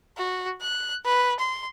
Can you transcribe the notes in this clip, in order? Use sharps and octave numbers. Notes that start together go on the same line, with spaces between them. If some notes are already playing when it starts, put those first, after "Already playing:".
F#4
F#6
B4
C6